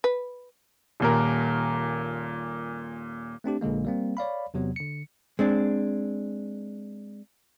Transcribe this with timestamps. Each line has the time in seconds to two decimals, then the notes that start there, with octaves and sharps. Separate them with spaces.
0.04 B4
1.00 D#1 A#2 A#4
3.44 A3 C4 D4 G4
3.61 A#1 A#2 D3 G#3 A#3
3.85 G3 A#3 C4
4.17 C#5 D5 F5 B5
4.54 E2 C3 F#3 B3
4.76 D3 C#7
5.39 G#3 C4 D4